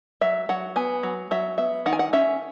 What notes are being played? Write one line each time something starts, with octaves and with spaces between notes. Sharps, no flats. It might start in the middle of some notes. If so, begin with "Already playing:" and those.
F#3 E5
F#3 F#5
B3 G#5
F#3
F#3 E5
B3 E5
D#3 F#5
G#5
F#5
C#4 E5